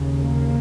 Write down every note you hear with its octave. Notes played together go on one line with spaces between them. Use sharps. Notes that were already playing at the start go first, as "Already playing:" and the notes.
Already playing: D#2 C#3
A#3